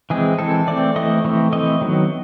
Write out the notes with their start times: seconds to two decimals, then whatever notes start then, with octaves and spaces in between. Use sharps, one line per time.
0.10 E3 G#3 C4 G#4
0.39 E3 G#3 C4 A4
0.67 E3 A3 C4 D5
0.96 E3 A3 C4 D#5
1.24 E3 A3 C4
1.53 E3 A3 C4 D#5
1.81 D#3 F#3 B3